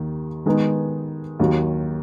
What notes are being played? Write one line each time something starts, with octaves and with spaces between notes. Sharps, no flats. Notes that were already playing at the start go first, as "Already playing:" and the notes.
Already playing: D#2 D#3
D#3 G#3 B3 D#4
D#2 D#3 F#3